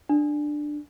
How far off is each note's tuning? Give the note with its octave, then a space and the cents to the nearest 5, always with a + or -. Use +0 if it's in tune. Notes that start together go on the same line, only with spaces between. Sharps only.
D4 +10